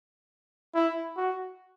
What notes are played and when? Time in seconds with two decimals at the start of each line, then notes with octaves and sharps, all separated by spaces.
0.75 E4
1.17 F#4